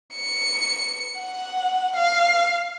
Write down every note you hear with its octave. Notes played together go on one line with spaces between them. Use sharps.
C#7
F#5
F5